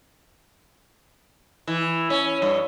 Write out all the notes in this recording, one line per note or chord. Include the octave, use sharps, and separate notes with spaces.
E3
C#4
G2